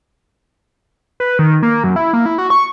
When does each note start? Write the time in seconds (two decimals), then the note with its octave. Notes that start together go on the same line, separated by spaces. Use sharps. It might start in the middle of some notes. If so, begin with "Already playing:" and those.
1.20 B4
1.39 D#3
1.63 A#3
1.84 F#2
1.96 E4
2.13 A#3
2.26 E4
2.38 F#4
2.50 C#6